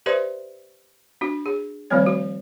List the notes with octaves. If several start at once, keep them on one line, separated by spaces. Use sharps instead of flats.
G4 B4 C5 D5 E5 C6
D4 F#4
G#4
D#3 F3 G3 A3 C4 C#5
F#4